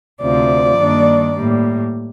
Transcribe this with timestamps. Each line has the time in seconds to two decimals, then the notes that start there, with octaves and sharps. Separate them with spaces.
0.21 D2 C3 F3 D5
0.78 G2 D#3 A#3 D4
1.33 A2 G3 A#3